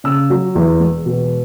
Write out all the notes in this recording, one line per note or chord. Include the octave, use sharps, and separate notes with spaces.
C#3 E6
F#3
E2
E1
B2